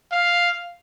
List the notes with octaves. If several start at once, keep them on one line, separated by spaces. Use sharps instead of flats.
F5